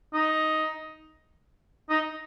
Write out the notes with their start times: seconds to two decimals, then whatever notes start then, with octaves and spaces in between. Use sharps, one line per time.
0.14 D#4
1.89 D#4